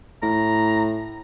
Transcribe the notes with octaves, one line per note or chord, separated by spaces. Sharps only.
A2 A#5